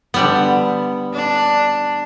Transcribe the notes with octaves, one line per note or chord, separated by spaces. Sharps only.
D3 G3 B3
D4